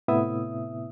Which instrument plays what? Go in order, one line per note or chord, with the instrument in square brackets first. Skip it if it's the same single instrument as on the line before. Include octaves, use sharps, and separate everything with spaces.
[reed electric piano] A2 C3 B3 E4 E5 D#6